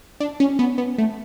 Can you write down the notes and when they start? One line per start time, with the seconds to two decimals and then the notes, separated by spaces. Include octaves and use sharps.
0.20 D4
0.40 C#4
0.59 B3
0.78 B3
0.98 A3